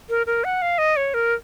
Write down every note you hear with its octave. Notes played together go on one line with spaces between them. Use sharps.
A#4
A#4
F#5
F5
D#5
C#5
A#4